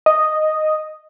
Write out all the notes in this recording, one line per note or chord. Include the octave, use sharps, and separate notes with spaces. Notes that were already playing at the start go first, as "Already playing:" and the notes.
D#5